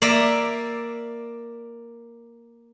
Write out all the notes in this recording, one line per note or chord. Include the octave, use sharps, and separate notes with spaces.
A#3 D5 E5